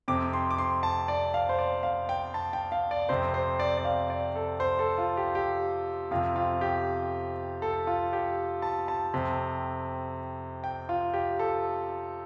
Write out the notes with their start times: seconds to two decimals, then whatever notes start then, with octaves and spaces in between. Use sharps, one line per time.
0.08 F2 C3 D6
0.33 C6
0.50 D6
0.58 C6
0.83 A5
1.08 D5
1.34 F5
1.49 C5
1.59 D5
1.83 F5
2.09 G5
2.34 A5
2.53 G5
2.72 F5
2.91 D5
3.09 F2 C3 C5
3.34 C5
3.59 D5
3.78 D5
3.85 F5
4.10 D5
4.36 A4
4.60 C5
4.79 A4
4.98 F4
5.17 G4
5.35 G4
6.11 F2 C3 F4
6.36 F4
6.61 G4
7.62 A4
7.87 F4
8.13 G4
8.62 A5
8.88 A5
9.13 F2 C3
10.64 G5
10.89 F4
11.14 G4
11.39 A4